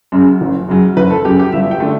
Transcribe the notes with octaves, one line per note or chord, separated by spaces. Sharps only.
F#2 C#3 F#3
F#1
F#2 C#3 F#3
F#1 B4
A4
F#2 C#3 F#3 G4
G4
G1 E5
G5
D3 A3